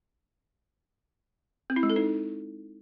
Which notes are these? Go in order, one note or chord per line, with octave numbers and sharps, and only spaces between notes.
C4
E4
G#3
A4
D#4